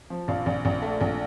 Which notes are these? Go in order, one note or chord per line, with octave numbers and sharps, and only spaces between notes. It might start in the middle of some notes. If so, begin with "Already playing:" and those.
F3
A#1 F5
A#1
A#1
A3
A#1